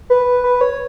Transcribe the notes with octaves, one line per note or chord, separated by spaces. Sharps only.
B4
B4
C#5